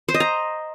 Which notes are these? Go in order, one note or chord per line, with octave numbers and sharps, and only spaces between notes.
C5
D#5
A#5